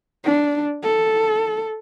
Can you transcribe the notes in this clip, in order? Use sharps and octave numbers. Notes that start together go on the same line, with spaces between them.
D4
A4